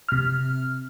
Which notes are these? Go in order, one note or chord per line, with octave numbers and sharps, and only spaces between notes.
C3 F6